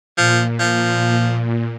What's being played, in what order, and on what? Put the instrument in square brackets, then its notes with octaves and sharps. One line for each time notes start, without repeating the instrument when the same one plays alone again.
[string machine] A#2 [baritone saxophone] F3
[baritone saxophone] F3